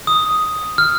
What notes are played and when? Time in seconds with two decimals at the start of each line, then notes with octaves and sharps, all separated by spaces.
0.07 D#6
0.78 F6